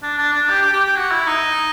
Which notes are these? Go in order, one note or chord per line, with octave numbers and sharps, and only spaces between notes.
D4
D4
D4
G4
G4
G4
G4
F#4
E4
D#4